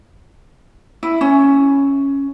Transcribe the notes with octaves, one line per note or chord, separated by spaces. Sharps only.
E4
C#4